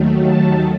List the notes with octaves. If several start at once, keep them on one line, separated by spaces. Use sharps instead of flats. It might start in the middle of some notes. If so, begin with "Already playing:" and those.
Already playing: D#2 D#3 F#3 A3
A5